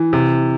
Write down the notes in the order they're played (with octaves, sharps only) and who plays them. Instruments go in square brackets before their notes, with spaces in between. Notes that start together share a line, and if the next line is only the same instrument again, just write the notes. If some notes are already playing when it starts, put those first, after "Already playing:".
Already playing: [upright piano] E3
C3